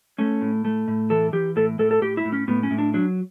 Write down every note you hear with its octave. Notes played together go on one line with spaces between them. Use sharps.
A3 C#4
A2
A3
A2
E3 A4
E3 G4
A2 A4
A2 A4
A4
A2 G4
E4
A2
C#4
A2 B3
C#4
A2
D4
F#3 D4